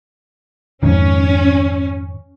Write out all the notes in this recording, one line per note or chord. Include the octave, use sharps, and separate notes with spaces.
F2 G#2 D#3 C#4